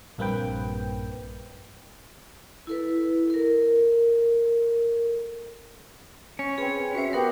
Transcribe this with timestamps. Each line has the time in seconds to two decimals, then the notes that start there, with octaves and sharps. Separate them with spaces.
0.18 A#1 G2 A#3 C4 B4 G5
2.67 E4 A4 B4
3.30 A4 A#4
6.39 C#4 C#6
6.58 C4 G#4 B4
6.95 F#4 B4 C5 E5
7.13 B3 G4 A#4 C#5 F#5